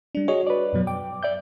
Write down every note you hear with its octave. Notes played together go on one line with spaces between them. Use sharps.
G3 D4
F#4 G#4 C#5 D#5
B4 D5
F#2 B2 F#3
G5 D6
D5 E5 G6